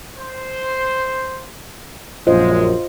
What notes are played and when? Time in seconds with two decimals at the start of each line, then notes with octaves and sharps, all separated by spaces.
0.17 C5
2.27 A#1 F#2 G#3 F4 C5 D#5